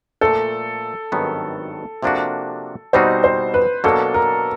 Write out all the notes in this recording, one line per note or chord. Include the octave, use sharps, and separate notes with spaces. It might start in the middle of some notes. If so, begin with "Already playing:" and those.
A#2 F3 A3 A4
G#1 G2 D#3 F#3 B3
C3 F3 A#3 D4 F#4
B2 G3 C4 D#4 F#4 C5
C5
B4
B2 F#3 A#3 D4 A4
A#4